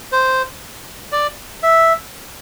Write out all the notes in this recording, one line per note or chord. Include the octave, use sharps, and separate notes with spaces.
C5
D5
E5